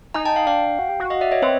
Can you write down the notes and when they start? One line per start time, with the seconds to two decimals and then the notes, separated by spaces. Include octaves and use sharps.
0.14 D#4 G#5 A#5
0.25 G5 A5
0.36 F5 G5
0.47 D4 F5 G5
0.79 F#4
0.89 G4
1.00 F#4
1.10 D#5 F5
1.21 D5 E5
1.32 C#5 D#5
1.42 C4 B4 C#5